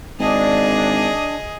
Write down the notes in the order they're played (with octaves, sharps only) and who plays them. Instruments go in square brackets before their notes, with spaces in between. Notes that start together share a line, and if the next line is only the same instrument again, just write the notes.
[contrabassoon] G#1 [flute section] D4 [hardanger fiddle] G#4 D#5